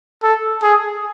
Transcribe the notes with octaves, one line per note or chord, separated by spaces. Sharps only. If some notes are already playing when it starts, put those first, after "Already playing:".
A4
G#4